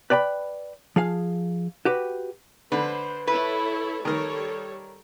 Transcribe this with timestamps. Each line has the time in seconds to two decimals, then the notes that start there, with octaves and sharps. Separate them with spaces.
0.10 B4 D5 G5 A#5 B5
0.96 F3 G#4 F5
1.85 F#4 G4 B4
2.72 D3 B4 C5
3.27 E4 A4 B4 C#5
4.05 D#3 G3 A4 A#4 C#5